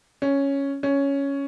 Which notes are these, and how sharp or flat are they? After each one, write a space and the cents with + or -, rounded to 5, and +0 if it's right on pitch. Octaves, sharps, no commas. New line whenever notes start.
C#4 +0
C#4 +5